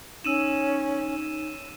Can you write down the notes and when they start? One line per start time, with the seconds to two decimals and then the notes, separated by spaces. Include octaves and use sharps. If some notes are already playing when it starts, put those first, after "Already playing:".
0.24 C#4 D#4 E6 D#7 E7